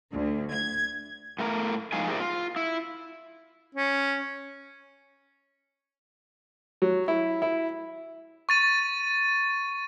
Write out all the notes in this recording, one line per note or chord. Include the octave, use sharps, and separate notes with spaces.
D2
G#6
A2 A3 A#4 A#5
A2 F3 G#3 D#4 F5 G#5
E4 G4 G#4 A#4 C5 D5
F4
E4
C#4
F#3
E4
E4
C#6 A6 D#7